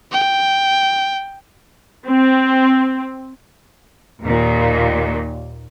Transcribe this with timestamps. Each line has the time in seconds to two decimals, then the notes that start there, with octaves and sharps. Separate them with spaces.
0.12 G5
2.06 C4
4.24 D#2 A#2